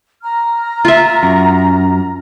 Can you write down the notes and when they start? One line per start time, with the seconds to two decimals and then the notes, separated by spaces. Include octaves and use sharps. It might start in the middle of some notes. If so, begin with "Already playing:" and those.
0.22 A#5 F6
0.85 F4 E5
1.23 F#2